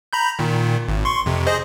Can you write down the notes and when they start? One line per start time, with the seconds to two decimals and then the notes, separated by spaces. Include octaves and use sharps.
0.13 A#5 B5 G6
0.39 A#2 D#3
0.88 G#1
1.05 C6 C#6
1.26 F2 C3
1.47 G#4 C5 D#5